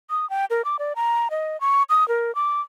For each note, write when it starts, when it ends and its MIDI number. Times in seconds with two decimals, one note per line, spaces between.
0.10 0.28 87
0.30 0.45 79
0.50 0.64 70
0.65 0.77 86
0.79 0.93 74
0.96 1.28 82
1.31 1.59 75
1.61 1.83 85
1.90 2.07 87
2.08 2.34 70
2.35 2.61 86